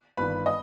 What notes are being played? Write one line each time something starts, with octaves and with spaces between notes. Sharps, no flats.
G1 G2 D#3 B4 B5
D#5 D#6